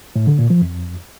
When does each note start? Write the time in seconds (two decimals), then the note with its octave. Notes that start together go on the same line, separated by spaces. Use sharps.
0.16 A2
0.27 D3
0.39 A#2
0.50 F3
0.62 F2